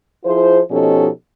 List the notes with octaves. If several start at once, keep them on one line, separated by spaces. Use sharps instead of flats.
F3 E4 F4 G#4 C5
B2 F3 C#4 D#4 G4 A4